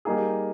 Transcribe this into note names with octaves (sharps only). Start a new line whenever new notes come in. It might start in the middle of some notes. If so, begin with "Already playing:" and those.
G3 A#3 D#4 G#4